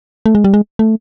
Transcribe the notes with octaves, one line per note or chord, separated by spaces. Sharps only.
A3
G#3
G3
G#3
A3